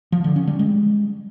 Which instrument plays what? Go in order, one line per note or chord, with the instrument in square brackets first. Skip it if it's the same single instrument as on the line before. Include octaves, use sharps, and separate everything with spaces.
[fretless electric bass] F3
D3
C#4
G3
G#3